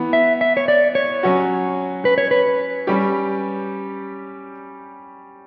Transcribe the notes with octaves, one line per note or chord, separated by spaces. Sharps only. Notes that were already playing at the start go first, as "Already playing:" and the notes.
Already playing: E3 B3
E5
E5
C#5
D5
C#5
F#3 C#4 F#4
B4
C#5
B4
G3 C#4 G4